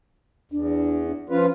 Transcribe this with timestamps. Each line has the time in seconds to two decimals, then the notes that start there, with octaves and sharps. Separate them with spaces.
0.52 E2 D4
1.30 F3 C#4 F4 B4